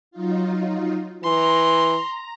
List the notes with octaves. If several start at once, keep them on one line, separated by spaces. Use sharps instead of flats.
F#3 D#4 F4
E3 A#5 C6